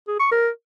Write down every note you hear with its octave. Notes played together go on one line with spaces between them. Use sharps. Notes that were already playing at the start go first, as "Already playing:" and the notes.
G#4
C#6
A#4